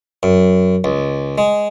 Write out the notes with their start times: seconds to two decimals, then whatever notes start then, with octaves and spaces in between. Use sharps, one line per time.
0.23 F#2
0.84 C#2
1.38 G#3